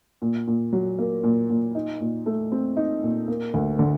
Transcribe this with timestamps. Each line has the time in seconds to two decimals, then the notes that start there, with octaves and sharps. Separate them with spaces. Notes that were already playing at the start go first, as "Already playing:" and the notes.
0.22 A#2
0.47 A#2
0.73 F#3
0.99 A#3
1.24 A#2
1.50 A#2
1.75 D#4
2.01 A#2
2.26 A3
2.52 C4
2.77 D#4
3.03 A#2
3.28 A#3
3.54 D2
3.79 D3